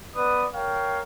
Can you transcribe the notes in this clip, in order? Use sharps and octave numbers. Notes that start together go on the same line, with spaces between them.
B3 B4 D5 D#6
A#4 C#5 F5 G5